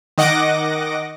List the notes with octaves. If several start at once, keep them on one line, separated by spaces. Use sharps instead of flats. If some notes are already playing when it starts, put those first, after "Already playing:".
D#3 D#5 F#5 D6 A#6